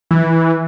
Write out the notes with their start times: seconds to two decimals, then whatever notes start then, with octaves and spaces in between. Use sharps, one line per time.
0.11 E3